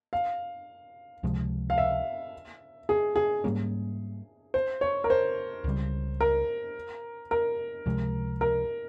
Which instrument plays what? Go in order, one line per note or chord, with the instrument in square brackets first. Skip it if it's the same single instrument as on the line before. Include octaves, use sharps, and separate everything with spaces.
[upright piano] F5
[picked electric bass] C#2 C3 F3 G#3
[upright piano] F5
E5
G#4
G#4
[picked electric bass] G#2 G3 A#3 C#4
[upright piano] C5
C#5
A#4
C5
[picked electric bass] C#2 C#3 G3
[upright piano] A#4
A#4
[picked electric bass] C#2 C3 F3 G#3
[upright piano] A#4